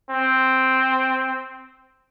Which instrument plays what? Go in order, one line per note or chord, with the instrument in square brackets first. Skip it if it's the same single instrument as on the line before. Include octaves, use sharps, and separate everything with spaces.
[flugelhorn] C4